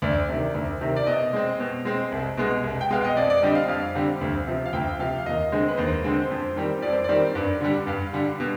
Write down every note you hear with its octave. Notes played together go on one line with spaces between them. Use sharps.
D2 D5
C3 D#3
D2
C3 D#3
D5
B2 D#5
G#3 C4
B2
G#3 C4
C2
B2 G#3 B3
C2
G5
B2 G#3 B3 F5
D#5
F2 D5
D5
D3 G3 C4 D#5
F5
F2 F5
D3 G3 C4
D2
C3 F3
F5
D2 G5
C3 F3 F5
F5
D#2 D#5
D3 G#3 C4
B4
D#2 C5
D3 G#3 C4
F2
D#3 G3 C4
F2 D5
C5
D#3 G3 C4 D5
G2
D3 G3
G2 F5
D3 G3
B2